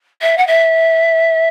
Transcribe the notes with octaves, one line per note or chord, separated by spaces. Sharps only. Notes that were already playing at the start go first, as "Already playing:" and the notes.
E5
F#5
E5